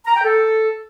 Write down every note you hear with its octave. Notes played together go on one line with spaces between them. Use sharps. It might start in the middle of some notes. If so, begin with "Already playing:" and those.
A#5
G5
A4